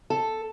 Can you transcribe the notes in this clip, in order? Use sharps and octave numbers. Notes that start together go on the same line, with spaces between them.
A4